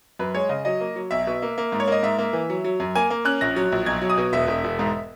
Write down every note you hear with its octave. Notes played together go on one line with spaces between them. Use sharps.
F#2 B4
G#3 C#5
C#3 D#5
F#3 D#5
A#3
F#3
B1 E5
B2
A#3
A#3
G#2
C#5
A#3 D#5
G#2 E5
A#3
E3
F#3
F#3
F#2
A#3 G#5
A#3
C#4 F#6
A#1 A#6
F#3
A#1
B1 G#6
F#3
D#6
B2
E1 E5
E1
E1
G#2